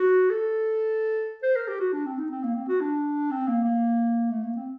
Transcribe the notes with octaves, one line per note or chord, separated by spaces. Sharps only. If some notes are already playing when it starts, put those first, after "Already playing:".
Already playing: F#4
A4
C5
A#4
G4
F#4
D4
C4
D#4
C4
A#3
C4
F#4
D4
C4
A#3
A#3
A3
A#3
C4